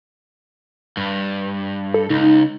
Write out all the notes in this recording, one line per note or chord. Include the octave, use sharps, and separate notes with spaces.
G2
A4
C#2 D#4